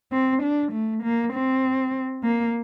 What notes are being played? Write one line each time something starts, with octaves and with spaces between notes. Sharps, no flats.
C4
D4
A3
A#3
C4
A#3